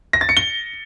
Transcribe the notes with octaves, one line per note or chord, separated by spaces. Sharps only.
A#6
A6
C#7
G7